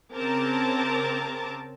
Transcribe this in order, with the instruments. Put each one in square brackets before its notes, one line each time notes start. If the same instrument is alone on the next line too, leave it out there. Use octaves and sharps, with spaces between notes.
[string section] C#3 C4 A#4 A5 D6